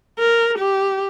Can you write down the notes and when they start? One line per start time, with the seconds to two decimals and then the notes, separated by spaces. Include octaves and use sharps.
0.19 A#4
0.59 G4